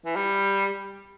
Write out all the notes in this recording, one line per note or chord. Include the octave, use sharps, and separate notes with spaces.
E3
G3